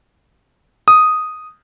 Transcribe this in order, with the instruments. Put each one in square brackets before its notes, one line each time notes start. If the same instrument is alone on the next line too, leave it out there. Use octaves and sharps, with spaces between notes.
[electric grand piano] D#6